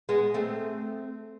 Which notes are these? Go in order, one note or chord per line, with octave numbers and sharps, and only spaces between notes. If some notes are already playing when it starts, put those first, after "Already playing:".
G#3 B3
A3 C4